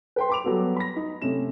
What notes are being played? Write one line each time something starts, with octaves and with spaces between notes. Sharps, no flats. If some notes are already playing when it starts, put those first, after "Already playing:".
B4 G5 C6
B5 D6 F7
F#3 G3 B3 F#4 A4
B5 A#6
D#4
C3 A3 C#4 E7